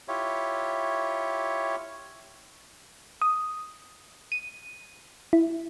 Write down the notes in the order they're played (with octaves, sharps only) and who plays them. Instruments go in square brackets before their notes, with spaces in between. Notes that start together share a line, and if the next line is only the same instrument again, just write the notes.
[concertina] E4 F4 G4 C#5
[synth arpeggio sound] D#6
D#7
E4